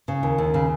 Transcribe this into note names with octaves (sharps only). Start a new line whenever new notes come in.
C#3
D#2
D#2
C#3